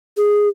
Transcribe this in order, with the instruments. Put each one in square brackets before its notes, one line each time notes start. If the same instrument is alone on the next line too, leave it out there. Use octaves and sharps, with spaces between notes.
[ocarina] G#4